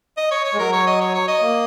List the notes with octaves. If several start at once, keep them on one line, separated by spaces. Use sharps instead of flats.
D#5
C#5
C#5
G#3
F#3 A#4
C#5
D#5
C#5
C#5
D#5
A#3